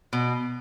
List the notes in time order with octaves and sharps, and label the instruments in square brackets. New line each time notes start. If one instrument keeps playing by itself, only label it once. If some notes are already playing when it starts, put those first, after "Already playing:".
[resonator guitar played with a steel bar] B2